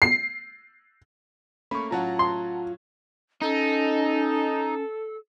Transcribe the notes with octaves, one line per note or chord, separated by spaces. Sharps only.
C7
A3 A#3 C#4 B5 C#6
A2 F#3 C#4 F4 F#5 A5 A#5
C6
C#4 D#4 A4